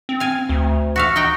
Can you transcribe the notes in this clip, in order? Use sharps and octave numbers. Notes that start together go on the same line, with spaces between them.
C4
F5 G#5
D2
F#4 E5 F5
D#4 F#4 G5